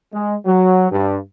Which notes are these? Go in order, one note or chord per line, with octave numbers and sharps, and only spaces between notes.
G#3
F#3
G2